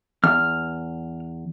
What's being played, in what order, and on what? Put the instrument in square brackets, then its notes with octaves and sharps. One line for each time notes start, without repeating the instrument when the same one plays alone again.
[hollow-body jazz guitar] E2 [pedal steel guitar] F6